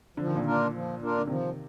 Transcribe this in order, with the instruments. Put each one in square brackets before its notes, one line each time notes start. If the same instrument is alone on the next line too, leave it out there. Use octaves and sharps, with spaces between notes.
[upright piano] D3 [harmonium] F3
[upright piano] D#3
A#2 D3
[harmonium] A#3 D4 F4 A#4
F3
A#3 D4 F4 A#4
[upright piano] D3
[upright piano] C3 D#3 [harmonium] F3